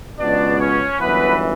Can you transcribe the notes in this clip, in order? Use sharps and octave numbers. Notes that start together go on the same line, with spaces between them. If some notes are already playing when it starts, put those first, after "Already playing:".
C#2 B2 D4 D5
C#4 C#5
G1 F#2 E3 B3 B4